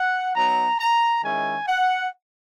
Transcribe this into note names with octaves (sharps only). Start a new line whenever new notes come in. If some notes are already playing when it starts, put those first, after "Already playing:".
Already playing: F#5
F#3 B3 D#4 A#5
A#5
D#3 G#3 C#4 E4 G#5
F#5